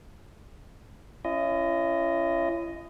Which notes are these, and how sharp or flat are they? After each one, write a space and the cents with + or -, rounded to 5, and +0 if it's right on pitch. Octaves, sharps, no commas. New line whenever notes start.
C#4 +0 E4 +40 D#5 +0